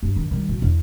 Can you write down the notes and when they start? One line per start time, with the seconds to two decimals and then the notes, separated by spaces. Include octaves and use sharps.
0.03 G2
0.16 D#3
0.31 D#3 G3
0.49 D1
0.62 E2